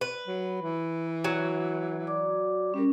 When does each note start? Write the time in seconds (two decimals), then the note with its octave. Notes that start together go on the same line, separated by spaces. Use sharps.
0.01 B4
0.27 F#3
0.62 E3
1.24 F#3
2.07 D5 D6
2.74 G3 C#4 A#4